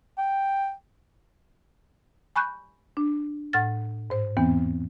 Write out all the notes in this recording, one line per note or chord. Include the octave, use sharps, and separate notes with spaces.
G5
G#5 B5 C#6 F#6 G6
D4
A2 F#5 F6 A6
G#2 C5
E2 E3 B3 C4